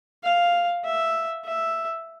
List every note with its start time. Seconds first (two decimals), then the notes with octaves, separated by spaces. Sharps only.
0.24 F5
0.84 E5
1.45 E5